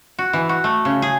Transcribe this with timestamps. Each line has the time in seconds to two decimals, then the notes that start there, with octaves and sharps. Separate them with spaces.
0.19 F#4
0.33 E3
0.49 F#4
0.64 A3
0.85 C#3
1.02 G#4